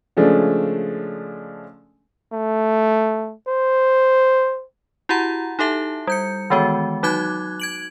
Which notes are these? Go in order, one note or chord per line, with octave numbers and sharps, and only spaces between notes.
C#3 F3 G#3 A3 D4
A3
C5
E4 F#4 G4 F#5 A#5
D#4 G4 A4 E5 A5
G3 G6 C#7
D#3 E3 G#3 B3 F#4
F#3 D#4 F#4 D6 F#6 G#6
G#6 D7 F#7